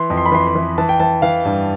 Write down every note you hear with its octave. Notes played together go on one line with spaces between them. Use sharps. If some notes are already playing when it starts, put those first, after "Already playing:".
Already playing: E3 C6
F2
C6
B5
E3 C6
C6
E3
E3 A5
G5
E3 A5
E3 F5
G2